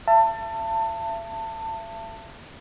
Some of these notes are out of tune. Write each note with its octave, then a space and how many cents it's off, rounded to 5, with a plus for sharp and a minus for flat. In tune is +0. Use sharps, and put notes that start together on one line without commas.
E5 +40 A5 +25